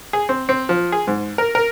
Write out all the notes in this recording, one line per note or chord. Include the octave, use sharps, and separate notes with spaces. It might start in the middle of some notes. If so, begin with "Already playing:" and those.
G#4
C4
C4
F3
G#4
G#2
A#4
A#4